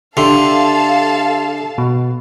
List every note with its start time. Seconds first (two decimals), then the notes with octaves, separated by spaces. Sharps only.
0.17 D3 G4 A4 E5 F5 A5 C6
1.78 B2